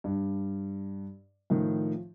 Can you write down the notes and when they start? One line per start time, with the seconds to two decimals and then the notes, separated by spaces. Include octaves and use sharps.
0.04 G2
1.50 A2 D#3 F3